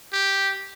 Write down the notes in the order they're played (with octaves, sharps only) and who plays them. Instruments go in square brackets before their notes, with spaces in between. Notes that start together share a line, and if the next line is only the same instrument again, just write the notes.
[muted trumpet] G4